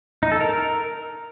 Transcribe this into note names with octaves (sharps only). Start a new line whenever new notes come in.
D#4
A4
A#4